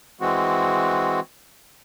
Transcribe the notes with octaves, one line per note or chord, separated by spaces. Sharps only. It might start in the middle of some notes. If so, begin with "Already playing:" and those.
E3 G#3 C4 F#4